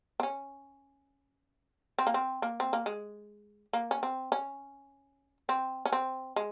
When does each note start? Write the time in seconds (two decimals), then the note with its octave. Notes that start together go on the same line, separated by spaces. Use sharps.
0.20 C4
0.23 C#4
1.98 C4
2.07 A#3
2.14 C4
2.42 A#3
2.60 C4
2.73 A#3
2.86 G#3
3.73 A#3
3.91 C#4
4.03 C4
4.32 C#4
5.49 C4
5.85 C#4
5.92 C4
6.36 G#3